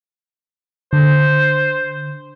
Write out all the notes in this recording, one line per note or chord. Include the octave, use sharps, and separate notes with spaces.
D3 C5